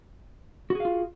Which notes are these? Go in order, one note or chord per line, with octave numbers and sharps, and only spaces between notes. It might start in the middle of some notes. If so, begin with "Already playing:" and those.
F4 F#4 G#4 F5